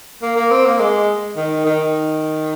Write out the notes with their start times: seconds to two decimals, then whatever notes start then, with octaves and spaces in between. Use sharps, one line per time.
0.22 A#3
0.36 A#3
0.51 C4
0.65 A#3
0.80 G#3
1.37 D#3
1.66 D#3